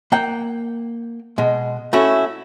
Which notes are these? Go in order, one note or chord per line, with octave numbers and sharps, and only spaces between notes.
A#3 F#5 G5
B2 G#3
A3 C#4 E4 F#4